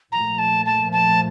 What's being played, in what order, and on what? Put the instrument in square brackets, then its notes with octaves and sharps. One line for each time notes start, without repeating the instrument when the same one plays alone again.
[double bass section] A#2 F3 A3 [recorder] A#5
[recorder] A5
A5
A5